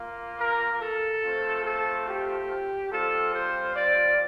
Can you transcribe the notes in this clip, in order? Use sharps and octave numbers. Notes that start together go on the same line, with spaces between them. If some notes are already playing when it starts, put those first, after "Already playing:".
Already playing: A#3 F4
A#4
A4
A3 C4 F4
A4
G4
G3 C4 F4 A4
C5
D5